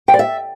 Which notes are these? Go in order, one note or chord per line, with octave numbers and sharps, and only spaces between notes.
G5
D5
E5